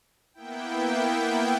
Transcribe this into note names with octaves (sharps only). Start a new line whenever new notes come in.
A#3 B3 E4 G5